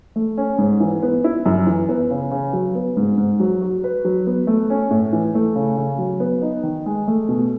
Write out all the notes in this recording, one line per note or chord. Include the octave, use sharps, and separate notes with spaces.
A3
C#4
G#2
E3
B3
E4
F#2
E3
B3
C#3
C#3
F#3
B3
G#2
G#2
F#3
F#4
B4
F#3
B3
A3
C#4
A2
E3
A3
C#3
C#3
F#3
B3
D#4
D#3
G#3
A3
B2